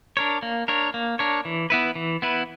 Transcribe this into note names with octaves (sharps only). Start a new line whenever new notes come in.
D4 A#4 C#5
A#3
D4 A#4 C#5
A#3
D4 A#4 C#5
E3
B3 E4 B4
E3
B3 E4 B4